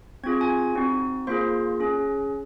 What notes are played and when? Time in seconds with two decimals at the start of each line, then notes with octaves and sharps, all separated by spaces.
0.24 C4 F4 G#4 G#6
0.41 G#5 G#6
0.75 C4 D#4 F#4
1.27 A#3 F4 G#4 C5 C6
1.80 C#4 G#4